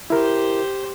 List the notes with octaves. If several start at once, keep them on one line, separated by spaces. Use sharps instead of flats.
E4 G4 A#4 C5